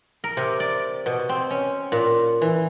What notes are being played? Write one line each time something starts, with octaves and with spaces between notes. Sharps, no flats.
A#4
C3
D5
B2
C4
C#4
A#2
E3